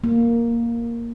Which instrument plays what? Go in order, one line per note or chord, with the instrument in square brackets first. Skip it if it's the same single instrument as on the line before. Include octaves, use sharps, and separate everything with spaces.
[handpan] A#3